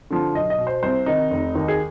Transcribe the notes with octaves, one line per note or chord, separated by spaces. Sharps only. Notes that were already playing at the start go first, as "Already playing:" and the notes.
D3 F3
B1 D#5
D#5
B2
C5
C2 C5
C3 D#3 D#4
F1
D#2 D#3
G#4